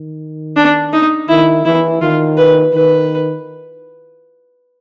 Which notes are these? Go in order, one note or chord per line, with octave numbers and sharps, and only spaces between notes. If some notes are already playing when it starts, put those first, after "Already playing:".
Already playing: D#3
D4
D#4
D#3 E4
E3 E4
D#3 F4
B4
D#3 B4